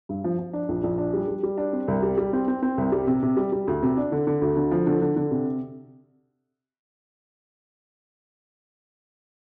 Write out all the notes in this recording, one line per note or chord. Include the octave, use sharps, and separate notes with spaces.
G2
F3
F3
D4
A#1
A#1
D4
G3
G3
G3
D4
C4
C2
G3
G3
C4
C4
C4
C2
G3
C3
C3
G3
G3
D2
C3
D4
D3
D3
D2
D3
F3
D3
D3
D3
C3